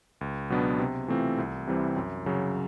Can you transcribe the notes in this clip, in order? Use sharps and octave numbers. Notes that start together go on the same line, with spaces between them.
C#2
B2 F#3 B3 D4
C3
E3 A3 C4 F4
C2
C3 E3 G3 C4
F#2
C#3 F#3